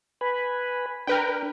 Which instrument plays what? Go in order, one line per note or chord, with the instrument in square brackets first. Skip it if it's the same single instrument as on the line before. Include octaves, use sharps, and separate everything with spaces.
[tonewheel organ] B4 G#5 B5
[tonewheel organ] D4 [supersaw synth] A#4 B4 G5